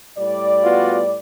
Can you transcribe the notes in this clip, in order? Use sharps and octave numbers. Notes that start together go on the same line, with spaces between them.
A2 G3 D5
B3 F4 F#4